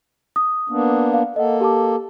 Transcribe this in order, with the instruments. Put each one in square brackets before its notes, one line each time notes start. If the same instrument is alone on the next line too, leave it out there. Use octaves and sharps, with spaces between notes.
[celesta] D#6
[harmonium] A#3 B3 D4
[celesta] F5
[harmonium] A#3 A4 [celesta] D#5 F#5
[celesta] G4 A5 D6